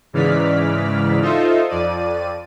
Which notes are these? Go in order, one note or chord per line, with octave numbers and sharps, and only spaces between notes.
G#2 C#3 E3 D5 F6 B6
D#4 F4 A4 C5 D#5 E5
F2 D5 D#7